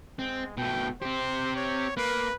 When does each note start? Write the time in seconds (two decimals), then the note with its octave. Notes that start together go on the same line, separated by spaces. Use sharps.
0.19 G#3 C4
0.57 B2 A3 G5
1.02 C4 G4 C5
1.56 C#5
1.97 A#3 B4